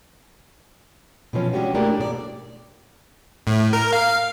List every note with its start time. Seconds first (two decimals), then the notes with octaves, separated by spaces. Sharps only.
1.33 B2 E3 F3 C#4
1.53 G#3 C#4 D4 F#4 G4
1.74 A3 A#3 D4 E4 G4 G#4
1.98 G#2 B2 G4 D5
3.47 A2
3.73 A#4
3.93 F5